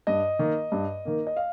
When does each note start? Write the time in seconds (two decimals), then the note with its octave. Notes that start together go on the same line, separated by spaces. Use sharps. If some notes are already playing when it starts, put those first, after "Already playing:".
0.07 G2 D#5
0.39 D#3 A#3
0.72 G2
1.05 D#3 A#3
1.27 D#5
1.36 F5